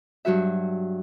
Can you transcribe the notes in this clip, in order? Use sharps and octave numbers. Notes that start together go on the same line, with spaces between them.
G2 F#3 F#4 E5